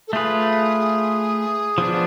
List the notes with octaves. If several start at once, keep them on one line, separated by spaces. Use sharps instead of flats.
A4
A3 F4 G#4 B4
F3 B3 D4